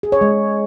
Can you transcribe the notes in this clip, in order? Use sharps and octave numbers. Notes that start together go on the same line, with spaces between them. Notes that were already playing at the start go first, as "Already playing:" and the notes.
G#4
C#5
G#3